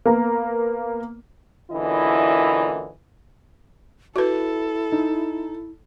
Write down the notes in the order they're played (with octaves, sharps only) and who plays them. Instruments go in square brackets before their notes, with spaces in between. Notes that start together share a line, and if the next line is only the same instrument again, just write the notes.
[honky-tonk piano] A#3 B3 A#5
[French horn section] F#2 A#2 D3 E3 E4 D#5
[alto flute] E4 [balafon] F#4 B4 [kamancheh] A4
[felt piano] D#4